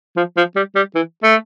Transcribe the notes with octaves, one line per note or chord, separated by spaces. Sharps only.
F3
F3
G3
G3
E3
A3